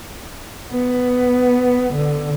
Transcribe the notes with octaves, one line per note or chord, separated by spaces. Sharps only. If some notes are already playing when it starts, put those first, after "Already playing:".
B3
D3